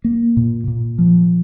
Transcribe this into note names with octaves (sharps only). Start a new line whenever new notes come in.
A#3
A#2
A#2
F3